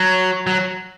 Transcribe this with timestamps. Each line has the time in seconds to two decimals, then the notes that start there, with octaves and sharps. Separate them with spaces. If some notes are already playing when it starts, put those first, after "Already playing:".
Already playing: F#3
0.47 F#3